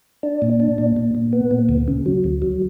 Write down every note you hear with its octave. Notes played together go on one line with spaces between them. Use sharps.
D4
A#2
D4
A#2
A#2
A#2
B3
A#2
D2
C#3
F#3
D2
F#3